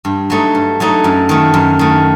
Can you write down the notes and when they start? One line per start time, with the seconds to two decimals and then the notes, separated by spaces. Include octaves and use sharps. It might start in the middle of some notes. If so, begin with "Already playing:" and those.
0.05 G2
0.30 F#3 A3 D#4
0.55 G2
0.80 F#3 A3 D#4
1.04 F#2
1.29 D#3 A3
1.54 F#2
1.79 D#3 A3